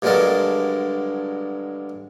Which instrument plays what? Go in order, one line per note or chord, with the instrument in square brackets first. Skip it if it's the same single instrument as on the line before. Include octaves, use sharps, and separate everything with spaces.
[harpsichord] G2 D3 F#3 G#3 A#4 A5